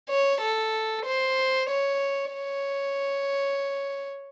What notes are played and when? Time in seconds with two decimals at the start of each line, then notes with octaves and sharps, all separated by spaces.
0.09 C#5
0.41 A4
1.05 C5
1.69 C#5
2.34 C#5